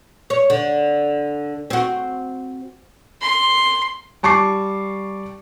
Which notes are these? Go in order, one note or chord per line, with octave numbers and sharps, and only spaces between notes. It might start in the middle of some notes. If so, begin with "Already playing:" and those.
C#5
D3
C4 F#4
C6
G3 A5 C#6 D6 C7